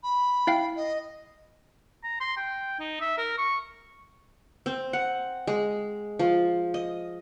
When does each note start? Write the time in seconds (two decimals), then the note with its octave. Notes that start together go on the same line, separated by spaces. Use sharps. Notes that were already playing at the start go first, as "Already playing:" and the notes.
0.03 B5
0.47 E4 F5 G5
0.76 D#5
2.04 A#5
2.20 C6
2.37 G5
2.79 D#4
3.01 E5
3.18 A#4
3.38 C#6
4.66 C4
4.93 F#5
5.47 G#3
6.19 F3
6.74 D#5